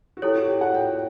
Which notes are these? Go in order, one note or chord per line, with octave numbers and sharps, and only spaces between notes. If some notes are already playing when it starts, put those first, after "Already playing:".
F#4
E4 G4 A4 C#5
F#4
G4
F#5
G5